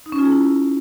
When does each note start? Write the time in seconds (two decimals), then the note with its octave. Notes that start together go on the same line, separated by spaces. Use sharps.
0.06 D#4
0.12 C#4
0.19 F4
0.25 G#4
0.32 E4